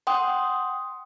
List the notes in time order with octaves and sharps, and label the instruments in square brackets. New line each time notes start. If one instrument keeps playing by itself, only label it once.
[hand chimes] F#5 G5 C6 D#6